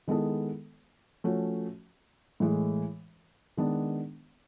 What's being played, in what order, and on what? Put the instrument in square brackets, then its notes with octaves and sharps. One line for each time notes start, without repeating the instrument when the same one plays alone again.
[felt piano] D#3 G#3 B3 E4 A4
F3 A3 C#4 F#4
A2 E3 G#3
D#3 G#3 B3 D4